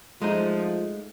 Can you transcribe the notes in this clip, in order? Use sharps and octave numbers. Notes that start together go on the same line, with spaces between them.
F3 G#3 A3 D#4